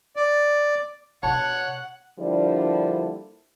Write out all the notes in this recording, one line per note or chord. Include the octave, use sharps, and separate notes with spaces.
D5
B2 D4 C#5 F#5 A5
D3 F3 G3 A#3 D4 E4